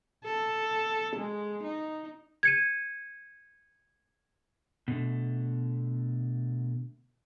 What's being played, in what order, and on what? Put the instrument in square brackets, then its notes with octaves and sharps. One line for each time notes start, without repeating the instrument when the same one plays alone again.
[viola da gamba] A4
G#3
D#4
[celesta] G#6 C#7 D#7
[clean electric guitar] B2 D3 A3